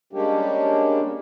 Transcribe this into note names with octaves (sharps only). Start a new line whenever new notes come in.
G3 G#3 A#3 C#4 D4 G4